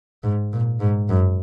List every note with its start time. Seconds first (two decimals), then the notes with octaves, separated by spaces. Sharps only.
0.24 G#2
0.53 A#2
0.80 G#2
1.09 F#2